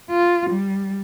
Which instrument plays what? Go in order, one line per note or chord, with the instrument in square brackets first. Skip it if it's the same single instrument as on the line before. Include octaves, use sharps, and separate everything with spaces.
[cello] F4
G3